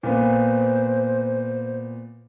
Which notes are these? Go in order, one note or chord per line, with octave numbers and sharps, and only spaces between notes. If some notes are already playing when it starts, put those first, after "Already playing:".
A#2 B3 C5